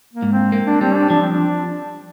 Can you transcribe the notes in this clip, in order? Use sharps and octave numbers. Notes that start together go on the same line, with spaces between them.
A#3
G#2
C4
A#3
D4
G3 C4
D4
F3 D4
C4
D4